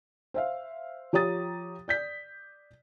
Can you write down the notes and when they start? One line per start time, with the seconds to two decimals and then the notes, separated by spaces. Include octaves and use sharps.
0.34 C5 E5 F5
1.13 F3 G4 C#5 A#5 D#6 A6
1.88 D5 G6 B6